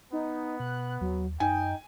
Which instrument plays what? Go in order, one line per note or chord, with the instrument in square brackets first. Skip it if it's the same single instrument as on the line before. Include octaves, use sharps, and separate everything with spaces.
[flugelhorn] B3 [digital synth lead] D#4
[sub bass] B2 [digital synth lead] F#6
[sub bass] D#2 [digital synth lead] F#3
[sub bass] F#2 [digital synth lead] D#4 [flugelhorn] G5 [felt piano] G#5